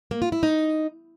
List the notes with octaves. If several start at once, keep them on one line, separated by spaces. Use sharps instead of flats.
A#3
F4
E4
D#4